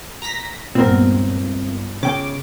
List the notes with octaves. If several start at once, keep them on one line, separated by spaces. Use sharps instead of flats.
A#5 A#6 B6
G1 C#2 G2 A#2 B3 C4 A#4
G1
C#3 G5 D6